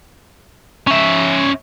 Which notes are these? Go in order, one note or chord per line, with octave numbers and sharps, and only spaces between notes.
C#4 E5